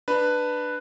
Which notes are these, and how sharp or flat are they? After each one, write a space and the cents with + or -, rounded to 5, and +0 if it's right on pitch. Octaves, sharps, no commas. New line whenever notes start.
D4 +20 B4 +0